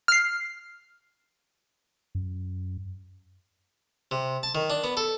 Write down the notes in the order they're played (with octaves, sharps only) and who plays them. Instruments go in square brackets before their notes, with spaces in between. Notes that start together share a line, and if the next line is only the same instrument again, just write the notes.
[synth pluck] F6 C7
[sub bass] F#2
[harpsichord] C3
A5
D#3
D4
B3
A4